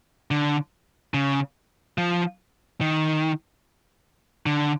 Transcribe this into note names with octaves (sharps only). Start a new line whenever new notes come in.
D3
C#3
F3
D#3
D3